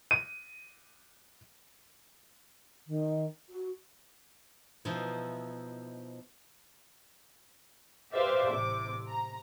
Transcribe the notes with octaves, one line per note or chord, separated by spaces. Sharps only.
D#7
D#3
F#4
B2 F3 D#4 E4
G4 B4 C5 D5 E5 F5
A1 C3 D6
A#5